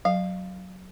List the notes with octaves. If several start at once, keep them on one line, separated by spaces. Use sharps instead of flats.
F#3 F5